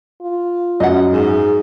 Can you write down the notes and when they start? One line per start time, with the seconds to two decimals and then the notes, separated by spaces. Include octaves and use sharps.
0.22 F4
0.80 F#2 D#5 F#5
1.13 G#2 G#4